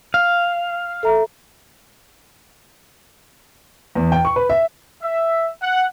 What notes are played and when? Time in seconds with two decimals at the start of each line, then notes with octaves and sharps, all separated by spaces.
0.14 F5
1.03 A4 E5 A#5
3.95 E2
4.12 G5
4.25 C#6
4.36 B4
4.50 E5
5.02 E5
5.61 F#5